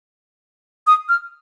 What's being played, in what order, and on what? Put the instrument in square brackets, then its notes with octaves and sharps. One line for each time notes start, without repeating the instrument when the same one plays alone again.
[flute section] D#6
F6